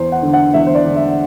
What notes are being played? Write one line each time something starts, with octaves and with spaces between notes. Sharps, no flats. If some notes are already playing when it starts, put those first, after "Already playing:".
Already playing: E2 C5
F#5
D3
F#5
E2 E5
C5
D5
D3
E5